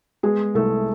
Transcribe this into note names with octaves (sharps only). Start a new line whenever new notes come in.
G#3 B3 G#4
C2 A3 A4